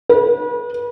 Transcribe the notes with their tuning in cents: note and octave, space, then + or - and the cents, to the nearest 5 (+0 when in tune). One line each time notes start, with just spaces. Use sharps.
B4 -35